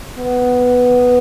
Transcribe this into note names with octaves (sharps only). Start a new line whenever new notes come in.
B3